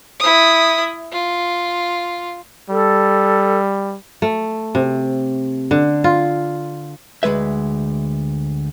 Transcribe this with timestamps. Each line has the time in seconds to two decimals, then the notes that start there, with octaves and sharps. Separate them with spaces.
0.20 E4 D#6
1.12 F4
2.70 G3 A4
4.22 A3
4.75 C3
5.71 D3
6.04 F4
7.23 D2 G#3 B4 E5